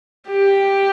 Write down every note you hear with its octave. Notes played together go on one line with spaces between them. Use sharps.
G4